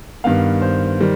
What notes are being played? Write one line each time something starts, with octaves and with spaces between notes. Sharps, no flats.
G2 D#3 B3 F5
C5
D#3 G3